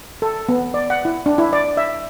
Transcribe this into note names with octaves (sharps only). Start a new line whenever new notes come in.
A4
B3
D5
F#5
E4
D4
E4
D5
E5